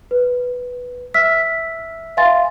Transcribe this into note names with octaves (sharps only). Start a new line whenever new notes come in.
B4
E5 E6 F6 B6
E5 F5 G#5 C6 A6